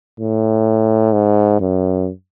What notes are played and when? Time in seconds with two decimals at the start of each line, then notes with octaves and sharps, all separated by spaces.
0.20 A2
1.13 G#2
1.60 F#2